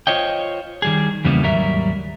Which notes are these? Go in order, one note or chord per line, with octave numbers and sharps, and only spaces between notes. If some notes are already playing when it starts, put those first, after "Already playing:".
F4 C5 C#5 D#5 G5
D#3 G3 G#4
E2 C#3 E3 G3 A#3 B3
D#2 G#2 F#3 G3 A#4 E5